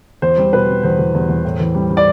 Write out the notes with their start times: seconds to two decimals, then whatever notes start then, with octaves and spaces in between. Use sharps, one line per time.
0.22 E2 C5
0.38 G3
0.53 B2 B4
0.69 G3
0.83 E2 C5
0.99 E2
1.14 E2
1.29 E2
1.45 A2
1.60 E3
1.75 G3
1.90 G3
1.97 D5